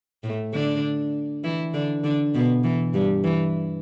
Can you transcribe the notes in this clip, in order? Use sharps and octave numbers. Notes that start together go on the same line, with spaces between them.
A2 A3
D3 D4
E3 E4
D3 D4
D3 D4
B2 B3
E3
G2 G3
E3